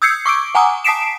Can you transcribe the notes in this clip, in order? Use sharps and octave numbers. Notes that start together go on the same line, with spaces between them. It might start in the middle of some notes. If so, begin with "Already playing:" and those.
D#6 E6 G6 G#6 C7 C#7
C#6 D6 E6 D7
F#5 G#5 A#5 D6 D#6
A5 D#6 B6 C7 D7 E7